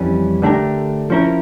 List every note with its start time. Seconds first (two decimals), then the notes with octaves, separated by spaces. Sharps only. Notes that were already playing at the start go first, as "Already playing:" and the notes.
Already playing: F2 E3 G3 C#4
0.42 D3 A3 D4 G4 A#4
1.10 F3 C#4 E4 A#4